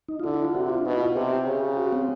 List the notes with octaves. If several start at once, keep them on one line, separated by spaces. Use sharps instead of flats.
D#4
F4
D3 E4
E4
F4
C3 F#4
F4
D4
B2 D#4
E4
F4
C3 G4
C#3
F#4
C4